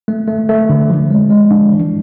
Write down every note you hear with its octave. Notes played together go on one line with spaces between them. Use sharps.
A3
A3
A3
D3
F3
G#3
G#3
D4
E3